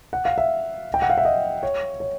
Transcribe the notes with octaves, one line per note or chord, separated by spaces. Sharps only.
F#5
F5
E5
G5
F#5
F5
E5
D#5
C#5
C#5